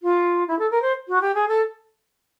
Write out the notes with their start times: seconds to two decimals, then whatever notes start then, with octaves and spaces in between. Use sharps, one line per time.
0.03 F4
0.48 E4
0.59 A4
0.71 A#4
0.82 C5
1.08 F#4
1.21 G4
1.35 G#4
1.48 A4